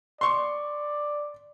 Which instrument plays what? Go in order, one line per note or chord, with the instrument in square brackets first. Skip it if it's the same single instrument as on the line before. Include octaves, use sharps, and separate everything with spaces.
[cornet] D5 [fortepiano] C6 C#6